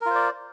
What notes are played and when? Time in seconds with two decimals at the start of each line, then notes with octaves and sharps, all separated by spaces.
0.01 A#4
0.06 F4
0.11 C5
0.15 D5